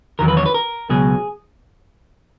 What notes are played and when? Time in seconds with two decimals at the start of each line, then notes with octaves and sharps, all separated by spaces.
0.19 E2 D#3 F#3 A#4
0.28 B4
0.37 C#5
0.46 B4
0.54 A#4
0.89 C#2 B2 F#3 G#4